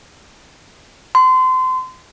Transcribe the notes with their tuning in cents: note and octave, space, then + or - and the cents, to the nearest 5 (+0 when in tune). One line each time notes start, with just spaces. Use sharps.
C6 -30